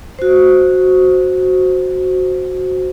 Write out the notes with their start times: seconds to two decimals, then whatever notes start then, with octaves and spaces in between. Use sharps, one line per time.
0.19 F#4 C5